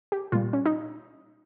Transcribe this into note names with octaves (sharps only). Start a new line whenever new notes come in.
G4
A#2 G3 F4
C#4
D#4